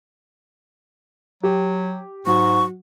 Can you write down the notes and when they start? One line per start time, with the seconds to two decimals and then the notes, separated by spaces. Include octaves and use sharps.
1.43 F#3 G4
2.27 G#2 F#3 C#6